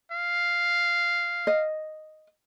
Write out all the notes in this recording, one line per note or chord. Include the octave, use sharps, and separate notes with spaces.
F5
D#5